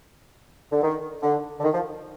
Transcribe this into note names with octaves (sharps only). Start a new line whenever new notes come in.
D3
D#3
D3
D3
D#3
F3